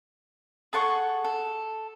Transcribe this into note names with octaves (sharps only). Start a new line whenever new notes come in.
G#4 A4 F#5 C#6
A4